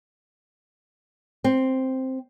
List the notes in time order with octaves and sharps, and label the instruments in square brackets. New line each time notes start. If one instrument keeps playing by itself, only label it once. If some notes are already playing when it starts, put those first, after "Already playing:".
[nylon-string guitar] C4